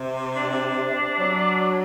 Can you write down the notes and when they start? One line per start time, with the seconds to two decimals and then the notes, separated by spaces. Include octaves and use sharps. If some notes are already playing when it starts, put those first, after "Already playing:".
Already playing: C3
0.36 D4
1.20 F#3